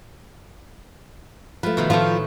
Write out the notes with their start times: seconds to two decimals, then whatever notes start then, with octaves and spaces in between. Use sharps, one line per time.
1.63 F3 A3 B4
1.77 B2 D#3 F4
1.90 A2 D#3 F3 A3 F4